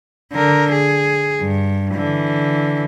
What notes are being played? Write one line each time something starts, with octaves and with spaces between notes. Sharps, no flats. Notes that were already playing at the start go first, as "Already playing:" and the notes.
D3 A#4
G#4
G2
D3 E3